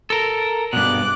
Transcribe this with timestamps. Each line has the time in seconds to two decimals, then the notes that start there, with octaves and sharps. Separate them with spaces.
0.10 A4 A#4
0.73 G2 B2 D6 F#6